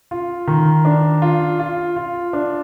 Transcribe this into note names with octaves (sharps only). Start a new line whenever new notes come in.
F4
D#3
D4
F4
F4
F4
D4